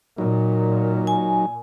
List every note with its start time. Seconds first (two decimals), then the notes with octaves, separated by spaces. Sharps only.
0.18 A#2 F#3 D#4
1.07 G#5